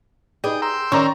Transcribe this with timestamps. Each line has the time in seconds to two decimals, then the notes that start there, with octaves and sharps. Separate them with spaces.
0.44 D#4 G#4 B4 D5 G5 D#6
0.62 G5 A#5 C6 E6
0.92 D#3 C#4 D5 A#5 C#6